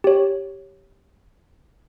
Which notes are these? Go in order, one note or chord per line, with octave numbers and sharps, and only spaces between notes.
G4 C#5